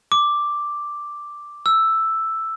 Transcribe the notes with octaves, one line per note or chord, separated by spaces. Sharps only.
D6
E6